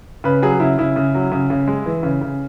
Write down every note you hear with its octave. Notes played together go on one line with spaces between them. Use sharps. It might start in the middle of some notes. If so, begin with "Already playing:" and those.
C#3 B4
F#3 G#4
C#3 E4
C#3 E4
C#3
F#3
C#3
C#3
G#3
E3
C#3
C#3